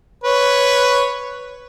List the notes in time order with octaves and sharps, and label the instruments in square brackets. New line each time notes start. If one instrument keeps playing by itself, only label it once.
[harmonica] B4 C#5